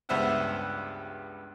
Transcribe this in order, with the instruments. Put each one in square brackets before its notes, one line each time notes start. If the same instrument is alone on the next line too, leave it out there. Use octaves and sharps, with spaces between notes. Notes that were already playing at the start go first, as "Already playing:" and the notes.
[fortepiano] C#2 G2 B3 C5 E5 F#5